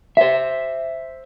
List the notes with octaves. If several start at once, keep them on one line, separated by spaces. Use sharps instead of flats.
C5 E5